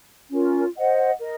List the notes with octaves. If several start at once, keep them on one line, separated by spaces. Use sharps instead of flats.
C#4 F4 A#4
C5 D#5 F#5
A#4 D#5